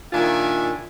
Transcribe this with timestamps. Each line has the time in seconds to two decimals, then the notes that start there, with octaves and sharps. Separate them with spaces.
0.13 A#2 D#3 D4 F4 E5 G#5